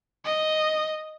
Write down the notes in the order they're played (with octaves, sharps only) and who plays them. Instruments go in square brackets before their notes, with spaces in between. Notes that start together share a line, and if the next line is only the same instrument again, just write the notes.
[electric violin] D#5